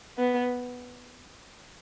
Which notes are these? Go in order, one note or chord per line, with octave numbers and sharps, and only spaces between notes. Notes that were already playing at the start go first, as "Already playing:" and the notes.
B3